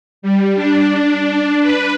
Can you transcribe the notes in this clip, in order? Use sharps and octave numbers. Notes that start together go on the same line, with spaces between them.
G3
D4
B4